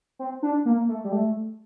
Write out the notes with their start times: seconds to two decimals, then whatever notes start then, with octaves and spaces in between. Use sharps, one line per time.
0.19 C4
0.43 D4
0.65 A#3
0.88 A3
1.04 G3
1.12 A3